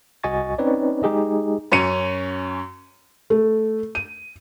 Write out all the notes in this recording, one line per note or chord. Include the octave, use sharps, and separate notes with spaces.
C2 F#4 D#5 G#5 C#6 A6
C4 C#4 D#4 B4 C#5 D5
G#3 D#4 G4 G#4 D#5
F#2 C#4 C#5 C#7 D#7
A3
D#7